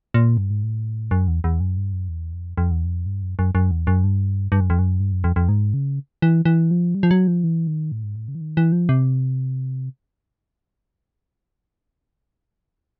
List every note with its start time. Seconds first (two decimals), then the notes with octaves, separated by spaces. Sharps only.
0.14 A#2
0.37 G2
0.50 G#2
0.63 A2
1.11 F#2
1.28 E2
1.44 E2
1.60 F#2
1.77 G2
1.93 F#2
2.09 E2
2.33 F2
2.58 F2
2.71 E2
2.85 F2
3.06 G2
3.22 F#2
3.39 F#2
3.55 F#2
3.71 E2
3.87 F#2
4.04 G2
4.52 G2
4.60 F#2
4.70 F2
4.79 F#2
5.00 G2
5.12 F#2
5.24 F2
5.36 F2
5.49 G#2
5.74 C#3
6.22 E3
6.45 E3
6.71 F3
6.95 G3
7.03 F3
7.11 F#3
7.27 F3
7.44 E3
7.67 D#3
7.92 A2
8.04 G#2
8.16 A2
8.28 C#3
8.35 E3
8.41 D#3
8.57 E3
8.72 F3
8.89 C3